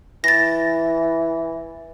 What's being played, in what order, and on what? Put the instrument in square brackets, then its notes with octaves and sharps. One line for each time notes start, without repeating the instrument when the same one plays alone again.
[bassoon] E3 [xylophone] A6 A#6